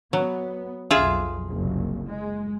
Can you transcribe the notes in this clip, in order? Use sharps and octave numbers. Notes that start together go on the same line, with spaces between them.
F#3 B3
B1 F2 F4 G#4 E5
F#1 C2
G#3